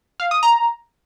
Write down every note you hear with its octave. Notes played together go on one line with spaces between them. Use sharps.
F5
D#6
A#5